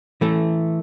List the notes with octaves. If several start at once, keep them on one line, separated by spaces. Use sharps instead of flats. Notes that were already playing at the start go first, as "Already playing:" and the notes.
E3 A3